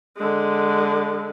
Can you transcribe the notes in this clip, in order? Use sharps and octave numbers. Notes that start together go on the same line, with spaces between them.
D3 G#3